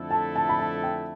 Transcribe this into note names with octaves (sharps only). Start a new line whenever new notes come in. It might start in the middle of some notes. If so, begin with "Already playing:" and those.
Already playing: F2 D3 A3 E4 A4
A5
A5
B5
A5
G5